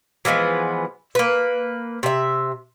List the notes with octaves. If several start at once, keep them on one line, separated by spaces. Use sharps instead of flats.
E3 F3 G#3 B3
A#3 B4
C3 E5